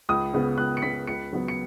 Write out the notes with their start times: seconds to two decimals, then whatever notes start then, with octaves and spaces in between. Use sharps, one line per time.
0.09 C#2 D#6
0.34 C#3 B3
0.57 C#2 F#6
0.77 C#7
0.82 C#3 B3 B6
1.07 C#2 C#7
1.33 C#3 F#3 B3
1.48 C#7